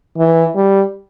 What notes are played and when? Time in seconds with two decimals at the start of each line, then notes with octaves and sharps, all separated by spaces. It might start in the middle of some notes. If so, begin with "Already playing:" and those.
0.18 E3
0.56 G3